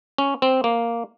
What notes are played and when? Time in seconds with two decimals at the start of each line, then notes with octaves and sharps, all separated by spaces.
0.18 C#4
0.42 C4
0.64 A#3